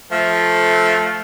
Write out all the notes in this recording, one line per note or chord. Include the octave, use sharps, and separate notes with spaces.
F3 A3